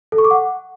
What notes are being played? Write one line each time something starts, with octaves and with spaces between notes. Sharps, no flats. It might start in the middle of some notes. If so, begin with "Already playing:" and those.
A4
C#6
D6
F#5